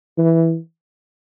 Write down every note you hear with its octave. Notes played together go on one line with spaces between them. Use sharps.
E3